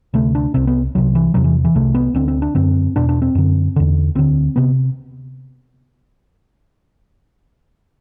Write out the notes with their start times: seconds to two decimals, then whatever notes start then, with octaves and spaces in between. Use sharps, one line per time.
0.14 D2 C3 A3
0.35 D4
0.54 C2 C3 C4
0.67 B3
0.95 C2 C3 F#3
1.15 E3
1.34 E2 C3 F#3
1.44 E3
1.65 E3
1.75 C2 C3 A3
1.95 B3
2.15 D2 D3 C4
2.28 C4
2.42 D4
2.55 F#2 D3 C4
2.96 E2 B2 D4
3.09 D4
3.22 C4
3.35 F#2 D3
3.76 E2 D3
4.15 D2 D3 C4
4.56 C3 B3